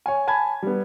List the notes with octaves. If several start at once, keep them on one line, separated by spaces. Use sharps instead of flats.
C#5 G#5
G#5 A5 B5 G#6
G3 B3